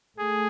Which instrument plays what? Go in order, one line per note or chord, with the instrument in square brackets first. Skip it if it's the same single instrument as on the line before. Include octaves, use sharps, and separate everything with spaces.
[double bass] A3 [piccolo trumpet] G#4